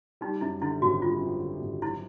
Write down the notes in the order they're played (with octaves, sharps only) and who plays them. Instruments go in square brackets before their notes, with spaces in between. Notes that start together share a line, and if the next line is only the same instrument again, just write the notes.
[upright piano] G3 [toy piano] D#4
[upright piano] F#2 [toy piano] E4
[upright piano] D3 [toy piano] E4
[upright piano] G#1 [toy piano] F#4
[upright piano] G3 [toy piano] F4
[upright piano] F#2
D3
G#1
[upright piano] F#3 [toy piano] E4